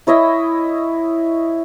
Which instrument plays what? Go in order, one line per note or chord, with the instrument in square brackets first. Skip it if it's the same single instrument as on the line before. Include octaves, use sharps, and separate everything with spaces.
[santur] E4 C#5 D#5 E5